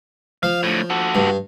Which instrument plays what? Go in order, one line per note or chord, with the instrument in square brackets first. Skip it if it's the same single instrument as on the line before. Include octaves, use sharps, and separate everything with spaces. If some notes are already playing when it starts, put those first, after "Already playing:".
[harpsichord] F3 [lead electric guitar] F5
[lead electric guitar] D2 A2
F#4 A4
[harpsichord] G2